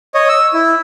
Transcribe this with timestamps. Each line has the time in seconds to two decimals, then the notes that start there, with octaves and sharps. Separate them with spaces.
0.14 C#5 D#5
0.29 E6
0.53 E4